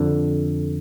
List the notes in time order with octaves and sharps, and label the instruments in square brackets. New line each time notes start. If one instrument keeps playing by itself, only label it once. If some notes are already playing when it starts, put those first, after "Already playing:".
Already playing: [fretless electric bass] F2 D3